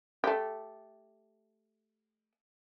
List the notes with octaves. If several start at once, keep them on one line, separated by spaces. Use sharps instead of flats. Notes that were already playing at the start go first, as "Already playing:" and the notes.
A3 G4